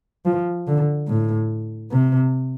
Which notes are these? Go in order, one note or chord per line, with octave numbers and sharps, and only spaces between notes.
F3
D3
A2
C3